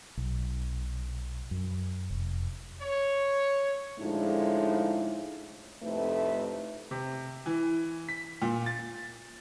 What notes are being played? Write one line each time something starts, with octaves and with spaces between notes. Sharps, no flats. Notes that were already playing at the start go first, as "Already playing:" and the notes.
B1
F#2
F1
C#5
A2 D3 F3 G#3 D#4
F2 A2 C3 A3 D#4 B4
C3
E3
B6
A#2
A6